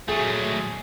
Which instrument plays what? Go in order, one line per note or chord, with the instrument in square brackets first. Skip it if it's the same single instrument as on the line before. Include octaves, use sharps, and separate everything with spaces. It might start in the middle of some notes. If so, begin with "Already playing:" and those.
[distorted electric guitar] F#3 A3 [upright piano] G#4